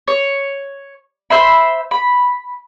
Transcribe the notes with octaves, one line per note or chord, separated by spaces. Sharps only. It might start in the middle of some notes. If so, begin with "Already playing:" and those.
C#5
C5 E5 B5
B5